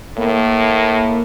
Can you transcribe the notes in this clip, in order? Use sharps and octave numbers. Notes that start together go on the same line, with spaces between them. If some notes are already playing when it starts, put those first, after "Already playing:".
A2 A#3